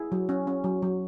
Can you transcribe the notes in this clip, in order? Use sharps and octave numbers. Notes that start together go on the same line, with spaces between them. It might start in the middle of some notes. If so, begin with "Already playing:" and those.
Already playing: E4 G#4
F#3
C#4
C#4
F#3
F#3